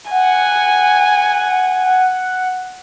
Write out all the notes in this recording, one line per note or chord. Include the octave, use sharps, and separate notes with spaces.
F#5 G#5